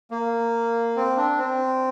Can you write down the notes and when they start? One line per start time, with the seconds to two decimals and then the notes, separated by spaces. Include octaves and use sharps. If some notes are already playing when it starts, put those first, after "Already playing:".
0.11 A#3
0.96 C4
1.17 D4
1.38 C4